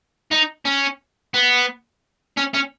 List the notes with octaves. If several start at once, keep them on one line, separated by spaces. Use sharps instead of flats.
D#4
C#4
B3
C#4
C#4